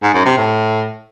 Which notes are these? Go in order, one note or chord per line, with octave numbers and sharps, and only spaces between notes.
G#2
F#2
C3
A2